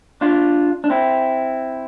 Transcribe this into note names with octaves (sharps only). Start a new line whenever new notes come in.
D4 F4
D4
C4 E4